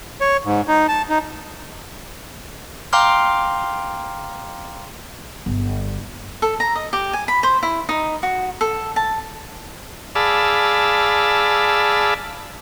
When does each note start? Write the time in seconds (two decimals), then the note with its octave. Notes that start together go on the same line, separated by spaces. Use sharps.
0.21 C#5
0.45 G#2
0.68 D#4
0.88 A5
1.09 D#4
2.93 F5 G5 A#5 C6 D6 F6
5.46 G1
6.42 A4
6.60 A#5
6.75 D#5
6.93 G4
7.13 G#5
7.28 B5
7.43 C5
7.63 E4
7.89 D#4
8.23 F#4
8.61 A4
8.96 A5
10.15 G#4 D5 F5 A5 B5 E6